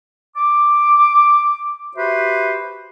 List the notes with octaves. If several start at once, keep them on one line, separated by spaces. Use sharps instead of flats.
D6
F#4 G4 B4 C5 E5